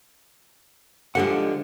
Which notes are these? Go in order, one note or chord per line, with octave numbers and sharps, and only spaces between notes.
G#2 D3 F3 G#3 G4 F#5